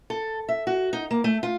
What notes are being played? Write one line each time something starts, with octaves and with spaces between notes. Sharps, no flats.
A4
E5
F#4
D#4
A#3
A3
F4